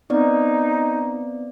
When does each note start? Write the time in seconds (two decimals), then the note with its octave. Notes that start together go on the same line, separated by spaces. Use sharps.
0.10 B3 C4 D#4 D5